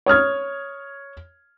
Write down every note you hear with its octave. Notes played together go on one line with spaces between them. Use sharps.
C#5 D#6 F6 G#6